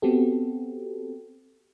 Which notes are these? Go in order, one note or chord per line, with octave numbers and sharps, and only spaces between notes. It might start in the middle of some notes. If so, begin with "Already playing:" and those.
B3 C4 F#4 G4 A4